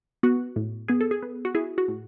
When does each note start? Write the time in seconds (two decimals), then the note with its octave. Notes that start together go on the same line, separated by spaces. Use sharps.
0.23 B3 F#4
0.56 A2
0.88 B3 G#4
1.01 A4
1.11 G#4
1.23 B3
1.45 F#4
1.55 E4 G#4
1.78 F#4
1.88 A2